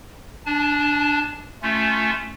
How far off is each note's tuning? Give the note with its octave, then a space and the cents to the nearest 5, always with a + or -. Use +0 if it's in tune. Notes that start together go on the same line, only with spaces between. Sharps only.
D4 +0 A5 -45
A3 +0 C#4 +0 F4 -15